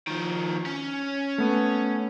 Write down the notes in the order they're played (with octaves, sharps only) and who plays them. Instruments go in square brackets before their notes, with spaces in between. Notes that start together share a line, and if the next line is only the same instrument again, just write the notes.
[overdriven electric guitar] D#3 F3
C#4
[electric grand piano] A3 B3